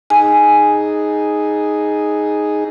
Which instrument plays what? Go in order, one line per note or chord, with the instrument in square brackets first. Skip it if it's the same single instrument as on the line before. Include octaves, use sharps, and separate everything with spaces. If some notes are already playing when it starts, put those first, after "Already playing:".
[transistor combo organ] D#4 G#4 [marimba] G#5